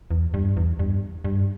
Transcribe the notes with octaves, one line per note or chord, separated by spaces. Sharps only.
E2
G2
E2
G2
G2